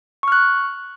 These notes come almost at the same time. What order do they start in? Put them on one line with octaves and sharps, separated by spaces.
C#6 F6 F#6